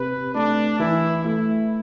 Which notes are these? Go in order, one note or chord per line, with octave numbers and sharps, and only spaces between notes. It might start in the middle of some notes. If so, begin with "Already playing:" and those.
Already playing: C3 B4
A3 D4
E3 E4
A3 E4